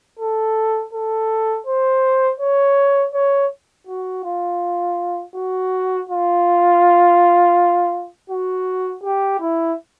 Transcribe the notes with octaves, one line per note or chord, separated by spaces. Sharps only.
A4
A4
C5
C#5
C#5
F#4
F4
F#4
F4
F#4
G4
E4